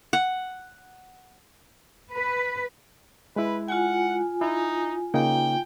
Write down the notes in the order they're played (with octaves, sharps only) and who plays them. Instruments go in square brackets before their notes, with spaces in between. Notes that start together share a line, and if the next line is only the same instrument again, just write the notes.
[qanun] F#5
[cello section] B4
[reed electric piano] G#3 E4 [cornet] B4
[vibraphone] F4 G#5 [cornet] F#5
[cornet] D#4 [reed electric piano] E4
[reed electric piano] C#3 A#3 D#4 [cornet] G5